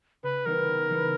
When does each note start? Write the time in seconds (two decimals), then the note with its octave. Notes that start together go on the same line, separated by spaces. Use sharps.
0.23 C#3 B4
0.45 E3 G3 B3 D#4 A#4
0.68 C#3
0.90 E3 G3 B3 D#4